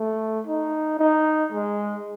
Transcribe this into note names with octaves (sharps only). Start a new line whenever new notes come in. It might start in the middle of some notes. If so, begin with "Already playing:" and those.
Already playing: A3
D#4
D#4
G#3